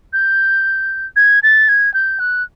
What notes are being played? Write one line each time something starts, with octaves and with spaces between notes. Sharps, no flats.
G6
G#6
A6
G#6
G6
F#6